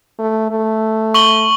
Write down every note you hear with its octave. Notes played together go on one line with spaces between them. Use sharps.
A3
A3
C#6 F#7 G7